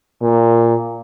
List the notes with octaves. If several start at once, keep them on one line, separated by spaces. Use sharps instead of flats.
A#2